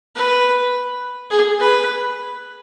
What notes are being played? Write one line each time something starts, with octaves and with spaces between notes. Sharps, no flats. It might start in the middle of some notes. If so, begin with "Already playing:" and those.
B4
G#4
B4